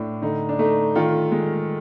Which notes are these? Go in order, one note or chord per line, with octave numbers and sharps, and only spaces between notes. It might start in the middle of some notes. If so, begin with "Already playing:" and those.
Already playing: A2 D4
D3 D#4
D4
A3 D#4
D#3 F4
G#3